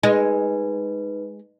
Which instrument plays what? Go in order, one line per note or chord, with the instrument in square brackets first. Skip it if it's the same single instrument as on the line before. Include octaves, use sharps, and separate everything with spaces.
[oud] G#3 [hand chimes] D#4 B4